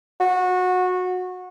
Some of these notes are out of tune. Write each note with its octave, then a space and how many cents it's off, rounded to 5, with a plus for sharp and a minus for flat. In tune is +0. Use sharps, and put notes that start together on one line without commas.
F#4 -20